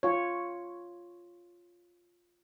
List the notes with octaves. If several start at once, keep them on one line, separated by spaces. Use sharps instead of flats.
F4 C#5